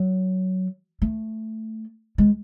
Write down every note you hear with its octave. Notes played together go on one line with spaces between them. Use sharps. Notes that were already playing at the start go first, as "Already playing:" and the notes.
Already playing: F#3
A3
G#3